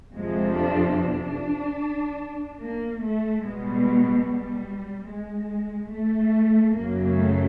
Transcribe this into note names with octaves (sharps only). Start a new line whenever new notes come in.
F2 C3 F3 G#3
D4
D4
A#3
A3
B2 G3 G#3
G3
G#3
A3
F#2 C#3 F#3 A#3
A3